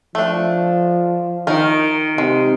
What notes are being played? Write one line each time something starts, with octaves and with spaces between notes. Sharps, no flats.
F3 A3 D4
D#3 D#4 A#4
C3 G#3